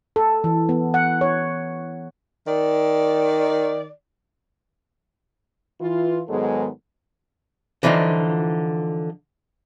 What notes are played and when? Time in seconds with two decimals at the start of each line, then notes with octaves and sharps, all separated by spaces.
0.16 A4
0.44 E3
0.69 B3
0.94 F#5
1.21 C#5
2.47 D#3 D5
5.80 E3 F4
6.29 G#2 D#3 F#3 G#3 B3 A4
7.83 D3 E3 F3 D#4 F4